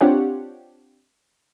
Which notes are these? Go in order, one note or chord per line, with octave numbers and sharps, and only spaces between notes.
C4 D4 F4 G4 C#5 F#5